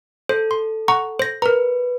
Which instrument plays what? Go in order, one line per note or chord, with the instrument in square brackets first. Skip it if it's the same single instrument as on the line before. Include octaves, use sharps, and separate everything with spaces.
[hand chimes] A4 [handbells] C5
[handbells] C6
F#5 A#5 C#6
C5 A#6
[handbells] A#4 A#5 [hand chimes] B4